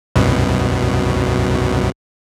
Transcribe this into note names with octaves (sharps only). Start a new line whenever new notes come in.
C2 F#2 B2